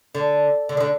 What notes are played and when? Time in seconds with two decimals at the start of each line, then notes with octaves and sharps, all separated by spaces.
0.15 D3
0.69 D3
0.77 D#3
0.80 D3